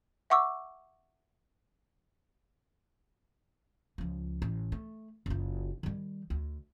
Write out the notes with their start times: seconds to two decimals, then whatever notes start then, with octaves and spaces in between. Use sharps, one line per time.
0.30 E5 F#5 C#6 D6 E6
3.98 C#2 F3
4.42 A1
4.72 A3
5.26 F#1 F4
5.83 D#3 G3
6.30 D2